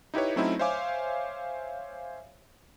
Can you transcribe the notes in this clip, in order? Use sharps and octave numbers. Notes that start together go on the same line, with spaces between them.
D#4 E4 G4 B4 C#5
F#3 A3 C4 C#4 D#4 E4
C5 C#5 E5 F5 G#5 D6